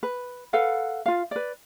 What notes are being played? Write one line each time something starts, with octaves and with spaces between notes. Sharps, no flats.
B4
A4 B4 F5 F#5
F4 F5
B4 D5